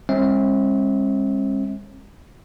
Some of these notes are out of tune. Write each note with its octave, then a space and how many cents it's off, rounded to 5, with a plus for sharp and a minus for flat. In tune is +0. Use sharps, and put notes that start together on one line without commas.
G#3 -40 C4 +45 E5 -35